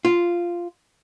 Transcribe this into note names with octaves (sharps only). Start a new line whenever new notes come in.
F4